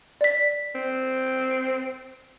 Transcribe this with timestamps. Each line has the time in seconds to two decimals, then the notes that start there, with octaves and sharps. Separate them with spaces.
0.21 D5 B6
0.75 C4